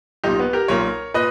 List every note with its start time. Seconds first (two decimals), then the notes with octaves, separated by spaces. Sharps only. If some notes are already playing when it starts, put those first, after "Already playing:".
0.24 B1 A#2 D#4 G4
0.39 B3
0.53 G4 A#4
0.68 B1 A#2 A#4 C#5
1.14 A#2 B4 D#5